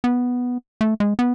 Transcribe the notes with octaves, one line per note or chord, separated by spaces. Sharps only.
B3
A3
G#3
B3